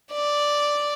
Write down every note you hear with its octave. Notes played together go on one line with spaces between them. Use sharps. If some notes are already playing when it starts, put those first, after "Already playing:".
D5